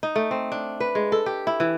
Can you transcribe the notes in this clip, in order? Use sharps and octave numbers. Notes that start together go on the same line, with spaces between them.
D#4
A3
C4
D4
B4
G#3
A4
G4
E4
E3